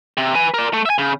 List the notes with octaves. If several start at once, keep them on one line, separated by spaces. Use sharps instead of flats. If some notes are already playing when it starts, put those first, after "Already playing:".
C3
B4 G#5
A#4 D5
A3
E5 G#5
C#3